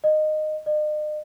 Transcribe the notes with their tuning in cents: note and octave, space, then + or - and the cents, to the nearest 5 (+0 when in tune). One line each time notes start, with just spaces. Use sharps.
D#5 -15
D#5 -45